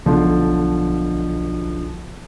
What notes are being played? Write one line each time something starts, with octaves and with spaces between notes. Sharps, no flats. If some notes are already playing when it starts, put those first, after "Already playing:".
B1 D3 F3